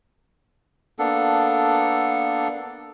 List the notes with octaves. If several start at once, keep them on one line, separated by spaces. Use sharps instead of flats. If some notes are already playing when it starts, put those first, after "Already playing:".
A#3 B3 D4 A4